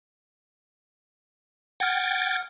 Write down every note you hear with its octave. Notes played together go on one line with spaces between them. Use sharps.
F#5 G5 F6 G#6 A6